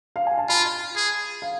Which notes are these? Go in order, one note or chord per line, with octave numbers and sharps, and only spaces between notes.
F5
G#5
A5
F4 B5
G#4
F5